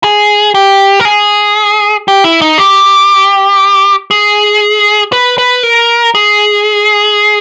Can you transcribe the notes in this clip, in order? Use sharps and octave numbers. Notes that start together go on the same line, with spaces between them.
G#4
G4
A#4
G#4
G4
E4
D#4
G4
G#4
B4
B4
A#4
G#4